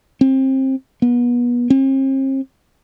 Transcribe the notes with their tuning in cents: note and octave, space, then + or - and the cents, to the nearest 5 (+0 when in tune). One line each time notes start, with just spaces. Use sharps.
C4 +25
B3 -30
C4 +45